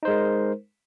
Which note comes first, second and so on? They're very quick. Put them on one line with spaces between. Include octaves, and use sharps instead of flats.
D#4 C5 G#3 A#4